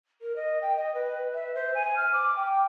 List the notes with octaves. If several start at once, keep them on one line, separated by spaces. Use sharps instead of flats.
A#4
D#5
G5
D#5
B4
E5
C5
G#5
F6
D6
G5